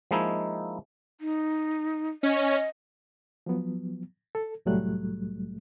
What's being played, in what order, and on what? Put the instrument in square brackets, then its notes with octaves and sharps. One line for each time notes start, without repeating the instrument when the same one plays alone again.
[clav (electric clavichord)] F3 G#3 A#3 D#4 E4
[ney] D#4
[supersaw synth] C#4 [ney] D#5
[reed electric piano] F3 F#3 B3
A4
C2 A2 F#3 G3 A3 F#6